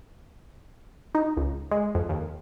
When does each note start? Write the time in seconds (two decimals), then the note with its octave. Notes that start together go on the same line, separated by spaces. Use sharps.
1.15 D#4
1.37 C#2
1.71 G#3
1.95 F2
2.09 D#2